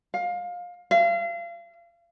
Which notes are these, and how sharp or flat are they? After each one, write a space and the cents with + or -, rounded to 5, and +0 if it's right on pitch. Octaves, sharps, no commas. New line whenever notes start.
F5 +20
F5 -35